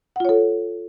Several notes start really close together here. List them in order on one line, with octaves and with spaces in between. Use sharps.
F#5 F4 C#5 A4